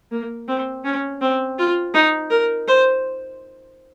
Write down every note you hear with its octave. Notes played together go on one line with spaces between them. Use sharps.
A#3
C4
C#4
C4
F4
D#4
A#4
C5